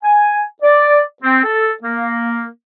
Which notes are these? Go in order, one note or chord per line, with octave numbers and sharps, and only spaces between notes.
G#5
D5
C4
A4
A#3